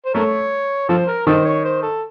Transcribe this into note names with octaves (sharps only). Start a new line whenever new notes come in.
C5
A3 A#4 C#5
F3 A4 C5
A#4
D#3 A4 C5
C#5
C5
A4